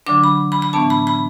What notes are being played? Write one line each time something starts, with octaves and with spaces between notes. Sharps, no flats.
D3 F#3 D4 D6
B5
B5
B5
A2 E3 B3 D4 A5
B5
B5